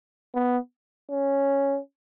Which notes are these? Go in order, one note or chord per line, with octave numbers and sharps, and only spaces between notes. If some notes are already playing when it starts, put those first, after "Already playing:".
B3
C#4